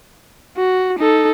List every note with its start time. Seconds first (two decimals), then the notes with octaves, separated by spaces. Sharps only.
0.57 F#4
0.99 D#4 A4